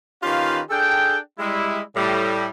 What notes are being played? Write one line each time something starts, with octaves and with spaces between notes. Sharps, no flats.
D#3 C#4 F4 G4 B4 F5
D4 G#4 A4 G5
G3 G#3 E4
A2 G3